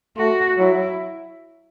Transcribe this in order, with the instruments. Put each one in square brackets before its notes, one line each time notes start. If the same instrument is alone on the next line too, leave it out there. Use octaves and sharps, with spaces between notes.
[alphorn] A3 [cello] F#4
[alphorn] F#3 [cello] E4